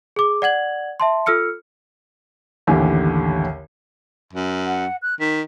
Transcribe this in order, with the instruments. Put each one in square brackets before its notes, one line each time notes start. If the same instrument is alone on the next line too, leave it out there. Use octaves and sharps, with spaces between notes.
[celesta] G#4 D6
D5 F#5 G#6 F#7
E5 A5 C6
F4 A4 E6 F6 C#7
[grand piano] A1 D#2 D3 G4 G#5
[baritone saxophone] F#2
[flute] F#5
F#6
[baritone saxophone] D#3 [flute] B6